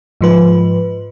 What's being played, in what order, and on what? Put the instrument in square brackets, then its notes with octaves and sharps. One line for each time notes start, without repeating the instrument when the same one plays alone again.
[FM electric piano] G#2 F3 B4